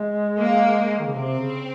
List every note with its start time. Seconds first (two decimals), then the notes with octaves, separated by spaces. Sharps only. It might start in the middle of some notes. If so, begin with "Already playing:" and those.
Already playing: G#3
0.38 A#3
0.99 D#3
1.07 C#3
1.14 C3 C4
1.39 C#3